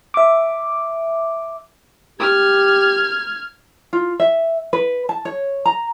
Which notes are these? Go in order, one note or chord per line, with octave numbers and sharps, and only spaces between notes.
E5 D6
G4 F6 G#6
F4
E5
B4
A5
C#5
A#5